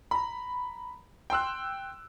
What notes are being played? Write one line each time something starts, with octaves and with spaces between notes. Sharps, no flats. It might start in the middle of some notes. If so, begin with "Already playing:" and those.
A#5 B5
G5 C6 E6 F#6